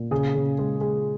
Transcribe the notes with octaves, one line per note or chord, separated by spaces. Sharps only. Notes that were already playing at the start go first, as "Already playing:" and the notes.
Already playing: A#2
C#3 G#4
C#3
G#3
G#3